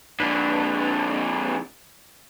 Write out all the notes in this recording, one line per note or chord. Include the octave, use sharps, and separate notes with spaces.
F2 D3 D4 B4